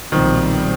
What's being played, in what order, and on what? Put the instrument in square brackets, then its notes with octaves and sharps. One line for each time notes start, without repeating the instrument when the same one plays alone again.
[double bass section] B1 A#2 G3 C4 [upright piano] D#3 F3